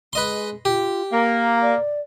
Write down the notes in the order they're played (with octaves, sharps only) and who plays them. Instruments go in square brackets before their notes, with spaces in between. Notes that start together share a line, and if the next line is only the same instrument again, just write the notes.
[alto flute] G#3 [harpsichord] B4 D#5 C6
[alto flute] F4 [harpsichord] G4
[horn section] A#3 [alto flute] A#5
[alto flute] D5